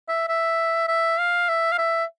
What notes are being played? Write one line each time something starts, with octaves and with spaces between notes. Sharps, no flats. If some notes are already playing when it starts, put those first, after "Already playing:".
E5
E5
E5
F5
E5
F5
E5